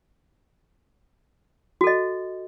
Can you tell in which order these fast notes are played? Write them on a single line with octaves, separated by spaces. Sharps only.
F#4 A4 D#5